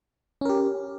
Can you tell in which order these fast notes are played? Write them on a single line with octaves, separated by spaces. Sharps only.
C#4 A#4 G4